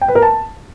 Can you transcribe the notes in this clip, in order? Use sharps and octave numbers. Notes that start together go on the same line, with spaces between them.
G5
B4
A#4
A5